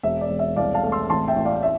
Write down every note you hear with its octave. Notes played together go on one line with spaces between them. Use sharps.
E1 E5
D5
E1
E5
C2 D5 F5
F5 A5
A3
C6 E6
A1 A5 C6
E5 G5
A1
D5 F5
E5